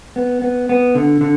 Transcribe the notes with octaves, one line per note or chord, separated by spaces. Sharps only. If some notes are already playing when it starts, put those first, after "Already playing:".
B3
B3
B3
D3
D3